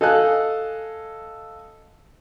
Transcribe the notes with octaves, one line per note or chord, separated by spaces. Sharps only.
A4 D#5 F5 G#5 F#6